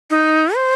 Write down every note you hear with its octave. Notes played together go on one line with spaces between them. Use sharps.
D#4
C5